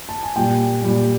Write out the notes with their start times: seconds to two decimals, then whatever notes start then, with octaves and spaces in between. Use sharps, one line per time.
0.09 A5
0.23 G#5
0.36 A#2 G3 G5
0.82 A#2 G3